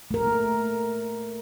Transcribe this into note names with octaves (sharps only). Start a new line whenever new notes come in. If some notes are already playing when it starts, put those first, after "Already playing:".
A3 A#4